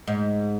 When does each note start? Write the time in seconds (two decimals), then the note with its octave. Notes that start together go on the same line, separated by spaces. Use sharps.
0.08 G#2